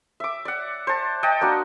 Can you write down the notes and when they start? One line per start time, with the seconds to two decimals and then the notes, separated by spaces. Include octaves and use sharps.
0.20 E5 D6
0.45 D5 F#5
0.87 C5 A5
1.23 D#5 F#5 G5 A5
1.41 A#3 D4 F#4